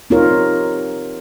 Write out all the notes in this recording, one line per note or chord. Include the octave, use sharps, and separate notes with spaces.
C4 D#4 F4 G4 A#4 C#5